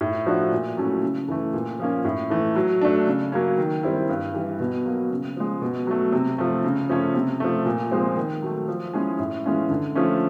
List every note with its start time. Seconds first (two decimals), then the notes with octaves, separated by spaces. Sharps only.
0.01 A2
0.26 F3 A3 D4 F#4
0.51 A#2
0.77 F#3 A3 C#4 E4
1.03 C#3
1.28 E3 A3
1.53 A#2
1.79 F3 A#3 C#4
2.05 A2
2.30 E3 A3
2.56 F#3
2.81 A3 D4
3.07 C#3
3.32 F#3 A#3 C#4
3.58 D#3
3.83 G3 C4 E4
4.09 G2
4.34 E3 G3
4.60 B2
4.85 F#3 A#3
5.10 C#3
5.37 F3 G#3
5.62 B2
5.87 F#3 A3
6.12 C3
6.38 F3 A3
6.64 C#3
6.89 F3 A3 C#4
7.15 C3
7.40 F3 A3
7.66 A#2
7.91 F3 G#3 C4
8.17 D#3
8.43 F#3 A3
8.68 F3
8.93 G#3 C#4 E4 G#4
9.19 A2
9.44 E3 G#3 C#4 F4
9.70 D3
9.95 F3 A3 C#4